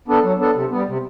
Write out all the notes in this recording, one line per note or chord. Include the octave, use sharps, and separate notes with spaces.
B3 D4 A4
F#3
B3 D4 A4
C3
G3 B3
C3